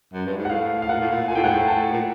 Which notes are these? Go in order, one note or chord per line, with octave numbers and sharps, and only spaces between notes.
F#2
G2
G#2
F#5
A2 F5
F5
A#2 F#5
A2
A#2
A#2 G#5
A2 G5
G#2 F#5
A2 G5
A5
A#2